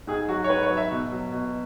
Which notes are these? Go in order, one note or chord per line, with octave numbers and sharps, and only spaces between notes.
G#2 G#4
F#3 F#4
C#5
G#2 B4
C#5
F#3
E5
B2
F#3
B2